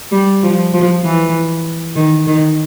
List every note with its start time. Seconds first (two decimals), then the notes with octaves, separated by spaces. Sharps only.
0.12 G3
0.43 F3
0.73 F3
1.04 E3
1.96 D#3
2.27 D#3